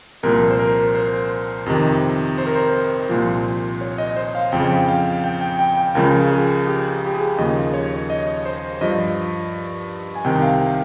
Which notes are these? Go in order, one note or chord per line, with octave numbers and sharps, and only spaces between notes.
C2 A#2 F3 A#4
C5
A#4
C5
F2 C3 D#3
C5
A#4
C5
C2 A#2 F3
C#5
D#5
C5
F5
F2 C#3 F3 G5
G5
F5
G5
G5
G5
G5
C#2 C#3 F3 A#4
G#4
G4
G4
G#4
D#2 C#3 F3 D#5
C#5
D#5
C5
G2 F3 D#5
G#5
C2 C3 D#3 G5
F5
G5